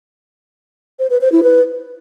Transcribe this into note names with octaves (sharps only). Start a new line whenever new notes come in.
C5
B4
C5
E4
B4